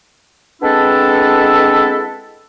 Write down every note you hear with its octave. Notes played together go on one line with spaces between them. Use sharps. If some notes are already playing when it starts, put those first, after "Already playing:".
G#3 B3 C4 D4 E4 A4